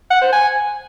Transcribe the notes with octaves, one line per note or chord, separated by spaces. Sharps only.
F#5
C5
G#5